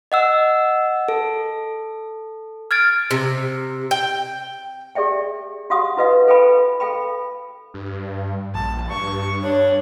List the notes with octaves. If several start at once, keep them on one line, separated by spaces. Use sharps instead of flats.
D#5 F#5 E6
A4
F6 G#6 A6 D7
C3
G5
G4 G#4 D5 E5 G5
F#4 G4 F5 F#5 D#6
E4 F#4 B4 D#5 F5 F#5
A4 B4 F5 G5 G#5 B5
A4 F5 G5 B5
G2
A#1 A5
G2 C#6
D4 C#5